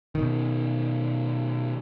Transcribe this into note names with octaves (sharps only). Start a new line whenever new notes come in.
B2 D#3